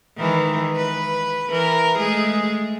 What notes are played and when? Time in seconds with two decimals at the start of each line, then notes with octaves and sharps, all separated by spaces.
0.18 D#3 E3 G#3
0.76 B4
1.49 E3 A#4
1.99 G#3 A3 G#4